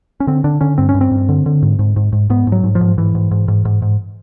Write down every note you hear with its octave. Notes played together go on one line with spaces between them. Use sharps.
C#4
D3 C4
D3 D4
D3 C#4
G2 C4
C#4
G2
C4
G2
D3
D3
G#2
G#2
G#2
G#2
G#2 B3
G#2
F#3
G#2
F3
G#2
G#2 E3
G#2
G#2
G#2
G#2
G#2